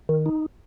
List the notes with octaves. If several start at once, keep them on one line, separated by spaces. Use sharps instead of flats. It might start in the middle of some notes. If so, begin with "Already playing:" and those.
D#3
D#4